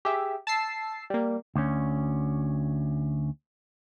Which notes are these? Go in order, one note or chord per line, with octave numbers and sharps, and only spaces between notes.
G4 G#4 E5
A5 E6 C7
G3 A#3
D2 C#4